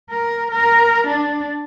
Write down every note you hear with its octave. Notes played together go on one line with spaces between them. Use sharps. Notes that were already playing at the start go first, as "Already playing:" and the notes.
A#4
A#4
D4